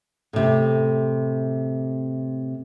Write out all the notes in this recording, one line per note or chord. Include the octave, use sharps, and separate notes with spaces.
A2 C3